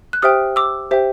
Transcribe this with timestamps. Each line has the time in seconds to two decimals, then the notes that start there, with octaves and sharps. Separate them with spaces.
0.13 F#6
0.22 G4 C5 E5 G5 D#6 F6
0.56 D6 E6
0.91 G4 C5 E5 G5